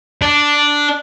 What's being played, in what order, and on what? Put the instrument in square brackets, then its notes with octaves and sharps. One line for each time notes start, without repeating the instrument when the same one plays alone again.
[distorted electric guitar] D4